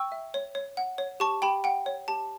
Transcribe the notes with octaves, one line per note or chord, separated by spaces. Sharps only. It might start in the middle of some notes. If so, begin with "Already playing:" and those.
Already playing: G5 C#6 E6
E5
C#5
C#5
F#5
C#5
G4 A5 C#6
G4 G5 B5
F#5 G5
C#5
G4 A5